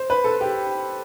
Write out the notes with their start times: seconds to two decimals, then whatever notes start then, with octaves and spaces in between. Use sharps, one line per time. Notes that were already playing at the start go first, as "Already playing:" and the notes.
Already playing: C5
0.10 B4
0.24 A4
0.41 G4